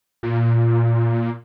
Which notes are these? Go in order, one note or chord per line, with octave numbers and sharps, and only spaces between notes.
A#2